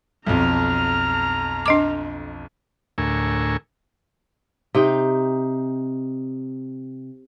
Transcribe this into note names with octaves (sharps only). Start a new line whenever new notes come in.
B1 F2 A#5 F6
D4 D#5 D6
D2 A2 A#4 G#5 C#6 E6
C3 D#4 G5